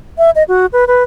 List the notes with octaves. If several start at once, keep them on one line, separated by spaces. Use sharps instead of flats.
E5
D#5
F#4
B4
B4